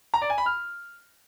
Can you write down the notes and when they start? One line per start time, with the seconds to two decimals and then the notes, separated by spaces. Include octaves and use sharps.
0.14 A#5
0.22 D5
0.30 G#5
0.38 B5
0.46 F6